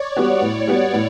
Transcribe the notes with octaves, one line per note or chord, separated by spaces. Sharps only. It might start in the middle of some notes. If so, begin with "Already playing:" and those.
Already playing: C#5 D5
G3 B3 F#4
A2
G3 B3 F#4
A2